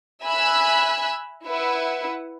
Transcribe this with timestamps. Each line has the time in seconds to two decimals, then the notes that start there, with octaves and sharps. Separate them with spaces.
0.24 E5 G#5 B5 E6 F#6
1.46 E4 B4 E5 F#5